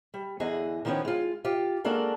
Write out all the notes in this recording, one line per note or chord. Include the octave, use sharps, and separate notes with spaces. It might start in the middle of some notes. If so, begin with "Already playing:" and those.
G3
E2 D3 G#4 D#5 F#5
D#3 F3 A3 B3 C#4 G5
G#3 F4
F4 G4
G#3 A#3 D4 F#4 A4 A#4